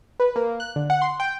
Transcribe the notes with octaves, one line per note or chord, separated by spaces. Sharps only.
B4
A#3
F#6
D3
F#5
C6
G5